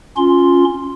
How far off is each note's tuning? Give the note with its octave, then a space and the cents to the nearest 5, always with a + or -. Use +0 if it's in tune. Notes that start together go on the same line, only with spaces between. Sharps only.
C#4 +0 F4 +10 C6 +0